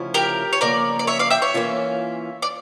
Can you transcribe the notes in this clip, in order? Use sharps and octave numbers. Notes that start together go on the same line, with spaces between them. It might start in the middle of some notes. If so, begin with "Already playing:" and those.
Already playing: D2 C#3 F3 C#4 E4
G4 A#4
C#5
E2 C#3 F3 A#3 C#4 A#4 D5
D5
C#5 E5
D5 F5
E5 G5
C#5 E5
E3 A#3 C#4 F4
D5